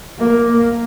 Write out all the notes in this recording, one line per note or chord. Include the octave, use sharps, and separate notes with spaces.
A#3